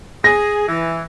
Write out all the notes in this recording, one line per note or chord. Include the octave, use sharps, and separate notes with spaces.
G#4 A#6
E3